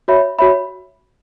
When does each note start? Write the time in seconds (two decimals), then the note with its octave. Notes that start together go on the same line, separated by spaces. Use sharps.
0.08 F#4 C#5 E5 B5
0.39 F#4 C#5 E5 B5